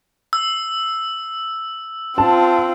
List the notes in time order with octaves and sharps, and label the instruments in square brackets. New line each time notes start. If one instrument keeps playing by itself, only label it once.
[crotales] E6
[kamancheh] C4 F4 [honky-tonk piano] A5